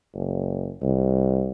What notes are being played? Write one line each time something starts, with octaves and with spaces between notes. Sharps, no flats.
F#1
C2